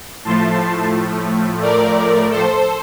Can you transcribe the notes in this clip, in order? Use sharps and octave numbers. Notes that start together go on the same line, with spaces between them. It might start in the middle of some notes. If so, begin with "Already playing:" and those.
A2 F3 A3 A5 C6
A#4 D5
A4 C5